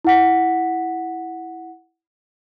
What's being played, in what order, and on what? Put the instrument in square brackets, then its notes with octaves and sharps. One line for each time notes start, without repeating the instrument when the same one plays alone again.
[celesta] E4 F#5 B6